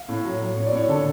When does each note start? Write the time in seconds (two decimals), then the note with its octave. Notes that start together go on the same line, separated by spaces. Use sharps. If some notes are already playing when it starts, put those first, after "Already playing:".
Already playing: F5
0.09 A2
0.25 F#3
0.40 F#3
0.56 A2 C#5
0.67 D5
0.72 A2 C#5
0.89 D3 A4